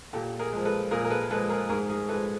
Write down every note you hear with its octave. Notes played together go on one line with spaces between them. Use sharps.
A#2 G4 A4
G#4 A#4
F3 G#3
A4 B4
A#2 G#4 A#4
A#4
A4 B4
F3 G#3 A4 B4
G#4 A#4
G#2 G#4 A#4
G#4 A#4
F3 G#3 A4 B4